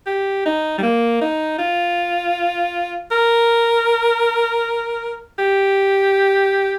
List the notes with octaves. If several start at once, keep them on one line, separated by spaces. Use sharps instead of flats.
G4
D#4
G3
A#3
D#4
F4
A#4
G4